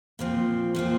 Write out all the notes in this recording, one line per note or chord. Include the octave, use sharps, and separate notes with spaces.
A#2 F3 C4
A#2 F3 C4